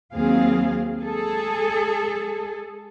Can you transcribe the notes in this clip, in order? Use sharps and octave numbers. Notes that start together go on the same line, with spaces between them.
D#2 F#3 C4 G#4 F5
G#3 G#4 A4